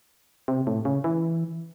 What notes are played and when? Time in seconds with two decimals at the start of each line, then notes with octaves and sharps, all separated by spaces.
0.48 C3
0.67 A2
0.85 C#3
1.04 E3